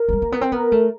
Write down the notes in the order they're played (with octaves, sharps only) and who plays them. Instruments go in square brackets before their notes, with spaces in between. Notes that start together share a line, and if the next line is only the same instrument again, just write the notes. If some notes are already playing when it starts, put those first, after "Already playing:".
Already playing: [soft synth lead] A#4
[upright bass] A3
G#3
A#3
B3
C4
[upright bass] B3 [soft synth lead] A#4
[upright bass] A3